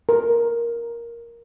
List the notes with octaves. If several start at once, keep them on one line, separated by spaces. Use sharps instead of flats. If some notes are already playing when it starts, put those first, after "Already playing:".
A#4